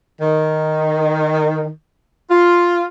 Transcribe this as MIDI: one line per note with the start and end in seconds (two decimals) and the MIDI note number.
0.22 1.68 51
2.31 2.85 65